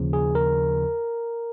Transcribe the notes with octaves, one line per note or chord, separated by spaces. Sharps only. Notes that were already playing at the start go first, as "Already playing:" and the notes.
Already playing: D#2 C#3 F3
G#4
A#4